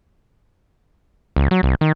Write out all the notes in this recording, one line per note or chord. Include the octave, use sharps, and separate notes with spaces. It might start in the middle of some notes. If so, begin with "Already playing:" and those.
C#2
F#3
C2
D#3